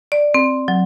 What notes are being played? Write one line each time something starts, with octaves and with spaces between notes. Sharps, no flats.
D5
C4
F#3